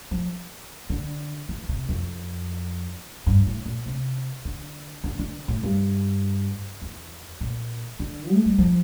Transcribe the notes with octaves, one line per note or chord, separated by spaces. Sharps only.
F3
D3
E3
C3
F2
G2
A2
A#2
C3
D3
D3
D3
A2
G2
E2
A#2
D3
A3
G3
F3